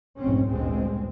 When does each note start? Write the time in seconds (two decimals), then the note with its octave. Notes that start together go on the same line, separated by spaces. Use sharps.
0.19 F1 B1 G#2 C4 C#4
0.49 G1 D2 A#2 G#3 C4